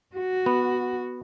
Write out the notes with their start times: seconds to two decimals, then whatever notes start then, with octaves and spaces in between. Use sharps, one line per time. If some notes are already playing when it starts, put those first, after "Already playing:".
0.16 F#4
0.46 B3